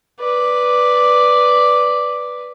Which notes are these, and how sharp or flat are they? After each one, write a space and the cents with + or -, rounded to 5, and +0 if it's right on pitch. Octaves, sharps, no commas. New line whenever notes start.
B4 +0 D5 +0